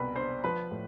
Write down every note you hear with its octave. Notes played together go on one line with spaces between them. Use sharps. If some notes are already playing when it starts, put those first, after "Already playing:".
Already playing: C2 B2 B4 B5
D4 C5 C6
F3 B4 B5
A2